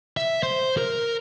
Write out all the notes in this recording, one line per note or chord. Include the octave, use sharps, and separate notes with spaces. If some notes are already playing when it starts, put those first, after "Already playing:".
E5
C5
A#4